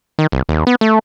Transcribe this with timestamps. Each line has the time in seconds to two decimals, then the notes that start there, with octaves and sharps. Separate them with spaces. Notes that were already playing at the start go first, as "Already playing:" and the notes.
0.19 D#3
0.32 C2
0.49 D#2
0.67 B3
0.81 A3